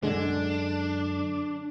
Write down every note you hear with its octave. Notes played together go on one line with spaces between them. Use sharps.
F#2 D3 G#3 D4